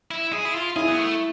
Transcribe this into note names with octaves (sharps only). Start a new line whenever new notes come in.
E4
G#4
E4
F4
E4 G#4
B3
A3